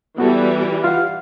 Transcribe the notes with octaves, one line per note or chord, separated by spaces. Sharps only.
E3 G3 B3 F#4 A4
F4 F5 F#5